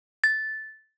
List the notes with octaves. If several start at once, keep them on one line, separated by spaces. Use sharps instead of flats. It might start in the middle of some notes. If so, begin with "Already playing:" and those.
A6